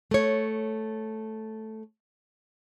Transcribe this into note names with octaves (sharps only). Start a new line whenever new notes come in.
A3 C#5